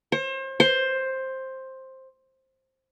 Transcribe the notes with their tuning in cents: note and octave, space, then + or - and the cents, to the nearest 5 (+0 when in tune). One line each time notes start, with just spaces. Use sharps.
C5 +35
C5 +10